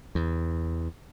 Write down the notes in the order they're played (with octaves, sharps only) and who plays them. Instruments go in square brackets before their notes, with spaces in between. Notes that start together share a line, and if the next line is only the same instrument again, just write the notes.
[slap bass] E2